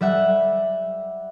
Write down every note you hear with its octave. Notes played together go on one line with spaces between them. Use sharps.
G3 E5 F#5